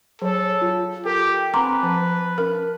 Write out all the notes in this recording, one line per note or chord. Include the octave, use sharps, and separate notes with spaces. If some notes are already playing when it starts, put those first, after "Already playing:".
F#3 G#4 A4 C#5
F4
G4 A4 A#4 G5
C4 B4 F#5 G#5 A#5 C6 D6
F3 A5
C#4 A#4